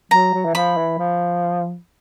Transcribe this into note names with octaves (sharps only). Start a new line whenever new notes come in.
F#3 A#5
F#3
E3
F3 B5
E3
F3